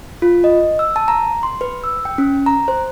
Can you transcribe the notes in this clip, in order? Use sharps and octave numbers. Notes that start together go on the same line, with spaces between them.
F4
D#5
E6
A5
A#5
C6
B4
E6
G5
C#4
A#5
C5